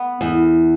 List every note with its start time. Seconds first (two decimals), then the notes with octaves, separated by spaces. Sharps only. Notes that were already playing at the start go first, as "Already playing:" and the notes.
Already playing: B3
0.21 E2